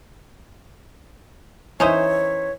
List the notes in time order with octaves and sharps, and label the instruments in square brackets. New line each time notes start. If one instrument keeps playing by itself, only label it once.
[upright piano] E3 E5 [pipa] C#4 D#4 C5 [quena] C#5